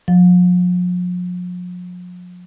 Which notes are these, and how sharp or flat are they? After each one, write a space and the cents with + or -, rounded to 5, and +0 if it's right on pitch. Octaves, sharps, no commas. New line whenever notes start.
F3 +45